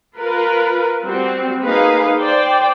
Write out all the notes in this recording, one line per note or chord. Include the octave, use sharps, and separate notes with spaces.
F4 A#4 B4
G3 C4 F#4
A#3 D#4 G#4 B4 F5
C5 D5 G5